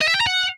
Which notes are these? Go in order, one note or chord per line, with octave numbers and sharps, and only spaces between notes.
D#5
E5
G5
A#5
F#5